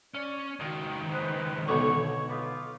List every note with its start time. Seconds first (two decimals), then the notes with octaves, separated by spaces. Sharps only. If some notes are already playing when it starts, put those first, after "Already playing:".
0.14 C#4 D5
0.60 C#2 D#3 F#4
1.12 G#3 B4 C5
1.68 B1 B2 D3 C#5 C#6
2.29 B3 D#4 F4 D6